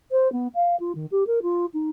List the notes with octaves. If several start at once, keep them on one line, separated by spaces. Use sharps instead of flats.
C5
B3
F5
F4
D#3
G4
A#4
F4
D#4